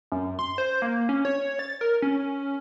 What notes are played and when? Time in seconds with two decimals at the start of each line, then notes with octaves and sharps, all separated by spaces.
0.12 F#2
0.39 C6
0.58 C5
0.82 A#3
1.09 C#4
1.25 C#5
1.59 A6
1.81 A#4
2.02 C#4